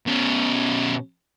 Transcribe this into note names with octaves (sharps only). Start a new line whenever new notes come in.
B2 C#4